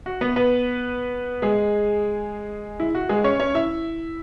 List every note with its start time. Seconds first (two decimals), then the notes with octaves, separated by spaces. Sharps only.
0.06 F#4
0.21 B3 B4
0.36 B3 B4
1.42 G#3 G#4
2.80 E4
2.95 F#4
3.09 G#3 G#4
3.24 C#4 C#5
3.40 C#4 C#5
3.55 E4 E5